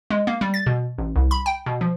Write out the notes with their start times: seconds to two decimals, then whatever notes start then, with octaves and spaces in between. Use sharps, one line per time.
0.10 G#3
0.27 A#3
0.41 G3
0.54 A6
0.66 B2
0.98 A1
1.16 C2
1.31 B5
1.46 G5
1.66 B2
1.81 F3